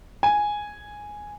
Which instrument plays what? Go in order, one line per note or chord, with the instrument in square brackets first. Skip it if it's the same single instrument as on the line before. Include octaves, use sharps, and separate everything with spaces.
[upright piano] G#5